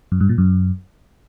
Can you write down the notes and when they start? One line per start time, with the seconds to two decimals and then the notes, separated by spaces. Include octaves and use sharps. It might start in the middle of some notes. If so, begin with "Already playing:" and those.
0.12 F#2
0.21 G2
0.29 A#2
0.38 F#2